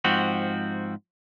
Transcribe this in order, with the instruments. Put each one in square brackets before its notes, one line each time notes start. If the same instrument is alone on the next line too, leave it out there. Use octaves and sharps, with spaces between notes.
[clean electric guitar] G#2 F3 C4 F#4